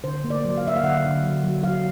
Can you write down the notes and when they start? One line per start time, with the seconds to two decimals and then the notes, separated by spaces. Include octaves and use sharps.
0.04 D3 C5
0.24 A#3
0.30 D5
0.45 F#3
0.57 F5
0.63 A#3 E5
0.76 F5
0.83 D3 F#5
1.05 D3
1.24 F#3
1.44 F#3
1.63 F#3 F5